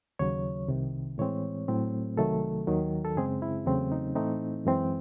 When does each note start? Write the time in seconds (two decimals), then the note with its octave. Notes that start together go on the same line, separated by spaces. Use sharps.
0.19 D#2 C#3 F#3 C#5
0.68 C2 C3 D#3
1.18 A2 E3 G#3 C4 C#5
1.68 A2 F#3 A3 C4
2.17 C2 C3 D#3 F#3 A3 A4
2.67 D#2 D#3 F#3
3.05 A4
3.16 F#2 C#3 G#3 C4 G#4
3.42 E4
3.66 E2 C#3 F#3 A3 C4
3.92 D#4
4.16 A2 E3 A3 C4 D#4
4.65 F#2 E3 G#3 C4